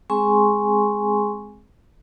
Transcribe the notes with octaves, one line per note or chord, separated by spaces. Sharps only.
G#3 C4 G#4 G#5 C6 C#6